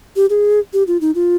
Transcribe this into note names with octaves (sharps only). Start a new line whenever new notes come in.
G4
G#4
G4
F4
D#4
F4